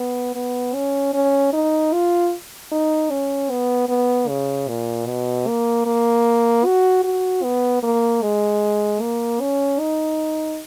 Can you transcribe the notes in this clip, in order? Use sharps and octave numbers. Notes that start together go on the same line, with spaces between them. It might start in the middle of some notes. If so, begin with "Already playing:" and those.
Already playing: B3
B3
C#4
C#4
D#4
F4
D#4
C#4
B3
B3
C#3
A#2
B2
A#3
A#3
F#4
F#4
B3
A#3
G#3
A#3
C#4
D#4